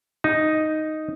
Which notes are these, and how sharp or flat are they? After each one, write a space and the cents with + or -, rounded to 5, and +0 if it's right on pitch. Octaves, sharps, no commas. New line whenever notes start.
D#4 +0